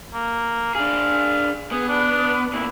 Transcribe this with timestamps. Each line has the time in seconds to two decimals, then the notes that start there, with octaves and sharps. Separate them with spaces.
0.14 A#3
0.75 D4 G#4 F5
1.72 B3 G#4
1.88 D4
2.53 E2 A#2 E4